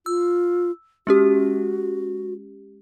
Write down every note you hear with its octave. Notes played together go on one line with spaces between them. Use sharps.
F4 E6
G#3 C#4 F#4 G4